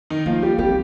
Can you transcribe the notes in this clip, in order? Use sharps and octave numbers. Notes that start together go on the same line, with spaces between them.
D#3 D#4
F3 A#3 F4
G3 G4
G3 C4 G4